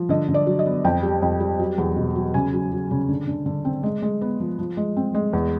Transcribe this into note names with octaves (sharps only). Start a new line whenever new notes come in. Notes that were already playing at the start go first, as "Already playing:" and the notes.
Already playing: F3
D3 D#5
D3
D5
F#3
D#5
B3
F2 G5
G3
F2
G3
F#3
E2
B2
F#3
C#3 G#5
F#3
F#3
C#3
D3
D3
D3
C4
G#3
G#3
B3
F3
F3
G#3
C4
G#3
E2